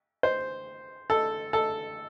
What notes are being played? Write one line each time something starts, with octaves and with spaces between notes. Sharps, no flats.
C5
A4
A4